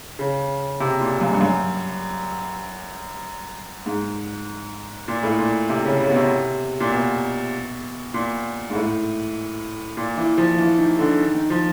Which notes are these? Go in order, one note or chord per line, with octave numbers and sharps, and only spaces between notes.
C#3
C3
A#2
F#2
G2
F#2
G#2
A#2
A2
A#2
C3
C#3
C#3
B2
C3
A#2
B2
A#2
G#2
A2
A#2
E3
F3
E3
D#3
D3
D#3
D#3
F3